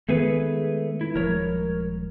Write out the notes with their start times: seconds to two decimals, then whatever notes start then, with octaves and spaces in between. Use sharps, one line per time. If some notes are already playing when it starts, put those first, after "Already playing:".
0.09 D#3 G#3 A3 B3 G#4 B4
1.01 E4
1.15 D#1 F3 G#3 A#4 C#5